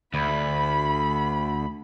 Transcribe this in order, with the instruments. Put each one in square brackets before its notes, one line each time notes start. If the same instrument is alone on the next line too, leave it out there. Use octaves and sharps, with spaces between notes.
[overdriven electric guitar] D2 [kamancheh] B5